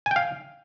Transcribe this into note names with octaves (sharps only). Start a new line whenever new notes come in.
F5 G5 G#5